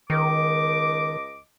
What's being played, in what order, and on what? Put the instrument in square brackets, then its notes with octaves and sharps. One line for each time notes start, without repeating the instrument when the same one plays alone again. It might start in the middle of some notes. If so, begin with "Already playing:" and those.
[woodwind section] C#2 D#5 D6 [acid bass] D#3